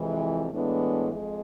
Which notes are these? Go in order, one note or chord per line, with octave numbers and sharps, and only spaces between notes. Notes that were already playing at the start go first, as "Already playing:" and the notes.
Already playing: F2 C3 E3 G#3
A2 E3 G#3 B3 D4
F2 G#3